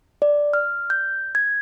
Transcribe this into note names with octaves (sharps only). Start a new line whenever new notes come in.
D5
F6
G6
G#6